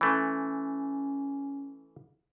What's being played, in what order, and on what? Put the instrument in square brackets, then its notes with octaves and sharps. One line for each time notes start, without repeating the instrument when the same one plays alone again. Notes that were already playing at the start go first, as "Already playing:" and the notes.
[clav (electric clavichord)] E3 A3 [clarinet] C#4